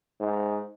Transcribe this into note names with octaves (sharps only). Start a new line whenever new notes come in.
G#2